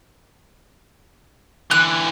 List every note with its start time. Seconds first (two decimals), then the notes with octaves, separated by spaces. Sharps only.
1.71 D3 E3 F#6